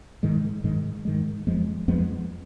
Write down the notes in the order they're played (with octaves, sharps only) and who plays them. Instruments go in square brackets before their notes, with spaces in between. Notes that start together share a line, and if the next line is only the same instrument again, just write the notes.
[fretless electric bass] G#2 D#3 G#3
G#2 D#3 G#3
G#2 D#3 G#3
F2 F3 G#3 B3
F2 F3 G#3 B3